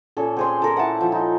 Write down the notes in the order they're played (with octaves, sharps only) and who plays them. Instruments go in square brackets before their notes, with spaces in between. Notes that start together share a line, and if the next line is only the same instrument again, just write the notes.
[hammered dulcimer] A#2 C#4 [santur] A4
[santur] C4 G#4 C6
A4 A#4
[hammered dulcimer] E4 [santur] F#5 A5
[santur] F3
[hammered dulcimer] D#4